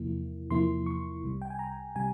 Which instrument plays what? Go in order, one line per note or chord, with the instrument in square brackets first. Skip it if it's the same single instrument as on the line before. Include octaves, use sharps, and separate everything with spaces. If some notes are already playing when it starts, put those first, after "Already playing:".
Already playing: [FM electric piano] E2 C3 F3 A#3 E4
E2 C3 F3 A#3 E4 C6
C#6
C2 C3 G3
G5
G#5
A#5
C3 G3 G#5